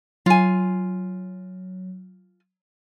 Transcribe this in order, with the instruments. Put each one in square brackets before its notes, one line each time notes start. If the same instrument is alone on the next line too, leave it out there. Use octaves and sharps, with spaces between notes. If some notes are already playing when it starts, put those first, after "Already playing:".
[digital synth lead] F#3 [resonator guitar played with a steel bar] F4 G#5